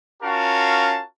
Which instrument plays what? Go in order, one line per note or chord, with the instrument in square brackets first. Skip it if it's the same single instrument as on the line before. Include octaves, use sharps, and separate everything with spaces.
[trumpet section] C#4 F4 F#4 A#4 F5 A5